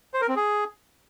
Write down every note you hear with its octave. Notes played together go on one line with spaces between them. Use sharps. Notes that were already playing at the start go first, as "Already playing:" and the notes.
C5
A#4
C4
G#4